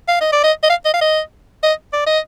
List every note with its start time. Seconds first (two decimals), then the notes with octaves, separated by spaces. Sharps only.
0.08 F5
0.21 D#5
0.32 D5
0.44 D#5
0.63 D#5
0.70 F5
0.85 D#5
0.94 F5
1.01 D#5
1.63 D#5
1.93 D5
2.06 D#5